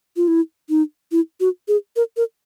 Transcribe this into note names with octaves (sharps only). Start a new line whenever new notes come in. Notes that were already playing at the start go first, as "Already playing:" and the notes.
F4
E4
D#4
E4
F#4
G#4
A#4
A#4